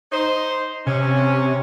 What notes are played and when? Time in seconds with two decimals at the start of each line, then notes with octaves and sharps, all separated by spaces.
0.12 D#4 C5
0.87 C3 C#4